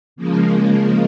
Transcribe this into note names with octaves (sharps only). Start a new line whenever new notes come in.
C#3 F3 G#3 A#3